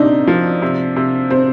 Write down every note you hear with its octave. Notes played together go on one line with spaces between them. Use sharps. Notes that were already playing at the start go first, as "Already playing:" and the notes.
Already playing: C3 A#3 D4 D#4
F3
C3
C3
C3 C4